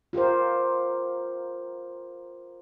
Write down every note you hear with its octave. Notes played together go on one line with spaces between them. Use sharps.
F4 G4 A#4 C5